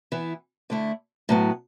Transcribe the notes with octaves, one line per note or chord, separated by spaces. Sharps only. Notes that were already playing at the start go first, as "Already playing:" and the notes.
E3 B3 E4
D3 A3 E4
A2 F#3 B3